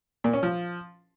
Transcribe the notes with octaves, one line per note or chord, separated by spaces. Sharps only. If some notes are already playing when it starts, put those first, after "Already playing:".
A#2
C#4
F3